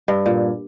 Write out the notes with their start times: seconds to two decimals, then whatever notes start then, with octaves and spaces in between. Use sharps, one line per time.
0.08 G2
0.26 A#2